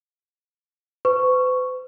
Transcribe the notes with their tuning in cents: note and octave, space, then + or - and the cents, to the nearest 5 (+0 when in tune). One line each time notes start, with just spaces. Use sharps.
B4 +45 C#6 +0